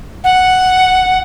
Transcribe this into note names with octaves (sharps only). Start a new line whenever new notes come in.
F#5